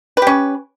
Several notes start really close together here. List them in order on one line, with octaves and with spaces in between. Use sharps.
B4 G4 C#4